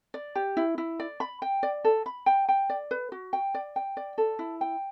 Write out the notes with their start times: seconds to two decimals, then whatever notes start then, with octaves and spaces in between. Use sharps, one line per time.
0.14 D5
0.35 G4
0.57 E4
0.78 E4
1.00 D5
1.20 B5
1.42 G5
1.63 D5
1.84 A4
2.06 B5
2.26 G5
2.48 G5
2.69 D5
2.91 B4
3.12 F#4
3.33 G5
3.54 D5
3.76 G5
3.97 D5
4.18 A4
4.39 E4
4.61 G5